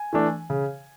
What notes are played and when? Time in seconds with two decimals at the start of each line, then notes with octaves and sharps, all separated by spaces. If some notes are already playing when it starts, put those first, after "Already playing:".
Already playing: G#5
0.13 E3 A3 D4
0.50 C#3